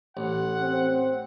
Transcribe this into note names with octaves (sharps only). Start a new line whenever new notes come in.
A1 F#5
C4